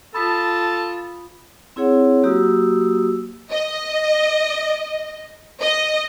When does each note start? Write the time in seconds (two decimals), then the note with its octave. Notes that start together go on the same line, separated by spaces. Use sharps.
0.14 F4 A4 A5 B5 D#6 B6
1.76 C4 E4 G#4 C#5 F#5
2.23 F#3 A#3 F#4 G4 D#6 E6
3.51 D#5
5.61 D#5